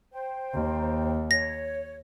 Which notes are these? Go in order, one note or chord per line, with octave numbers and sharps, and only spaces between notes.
C5 G5
D#2
C#5 A#6